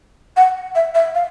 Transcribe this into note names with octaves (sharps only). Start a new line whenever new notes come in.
F#5
E5
E5
F5